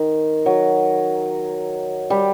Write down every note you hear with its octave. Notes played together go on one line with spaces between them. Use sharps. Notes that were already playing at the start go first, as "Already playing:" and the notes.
Already playing: D#3
F#3
G3